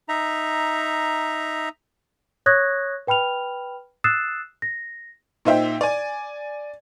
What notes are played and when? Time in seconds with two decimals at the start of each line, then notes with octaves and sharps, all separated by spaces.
0.09 D#4 E5 A#5
2.46 C#5 C#6 D#6 F#6 G#6 A#6
3.07 B4 G5 B5 F6 F7
4.04 D#6 E6 F#6 A6 C7 E7
4.62 A#6
5.45 A#2 D#4 C5 E5 G5
5.81 D5 G#5